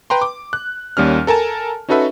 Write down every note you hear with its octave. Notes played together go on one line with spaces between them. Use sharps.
B4 G5 A#5 C6
D6
F#6
D#2 G3 C#4 F6
A4 A#4 G#5 A5
C#4 D#4 F#4 A4 B4 E5